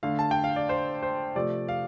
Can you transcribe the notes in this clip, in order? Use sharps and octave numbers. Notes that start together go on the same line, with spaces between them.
D3 A3 F5
A5
G5
F5
D5
C5
C5
C3 F3 A3 D5
F5